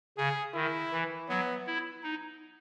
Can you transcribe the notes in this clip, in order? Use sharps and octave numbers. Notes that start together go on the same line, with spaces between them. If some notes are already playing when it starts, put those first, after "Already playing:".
C#3 G#4
D#3 E4
E3
F#3 B3
E4
D#4